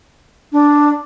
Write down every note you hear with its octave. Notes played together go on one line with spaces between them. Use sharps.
D4